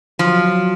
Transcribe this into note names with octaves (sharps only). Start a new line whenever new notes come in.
F3 F#3